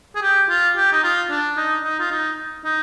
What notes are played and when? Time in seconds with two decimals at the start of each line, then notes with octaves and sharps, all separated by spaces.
0.15 G#4
0.22 G4
0.49 F4
0.76 G4
0.92 D#4
1.04 F4
1.30 D4
1.57 D#4
1.84 D#4
2.00 F4
2.11 D#4
2.65 D#4